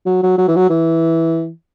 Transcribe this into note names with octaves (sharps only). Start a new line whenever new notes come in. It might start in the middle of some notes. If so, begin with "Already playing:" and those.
F#3
F#3
F#3
E3
F#3
E3